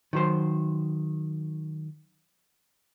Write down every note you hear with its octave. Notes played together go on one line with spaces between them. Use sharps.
D#3 F#3 C5